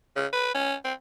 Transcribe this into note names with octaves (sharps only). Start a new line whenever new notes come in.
C#3
B4
C#4
C4